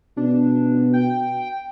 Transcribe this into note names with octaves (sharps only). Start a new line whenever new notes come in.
B2 D4
G5